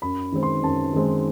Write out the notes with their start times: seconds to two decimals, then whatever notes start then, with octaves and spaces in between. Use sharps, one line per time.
0.02 F#2 B5
0.32 D#3 G#3 C4
0.43 C6
0.63 F#2 A5
0.93 D#3 G#3 C4